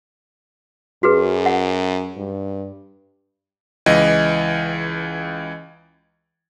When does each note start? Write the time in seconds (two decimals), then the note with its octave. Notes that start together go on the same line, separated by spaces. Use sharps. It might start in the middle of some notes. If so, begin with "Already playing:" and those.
1.03 F#2 F#4 G#4 B4
1.46 F#5
2.18 G2
3.86 C#2 E3 D#5